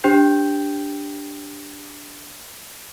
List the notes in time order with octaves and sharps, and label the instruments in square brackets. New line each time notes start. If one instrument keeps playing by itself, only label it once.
[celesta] D4 G4 C5 G5 G6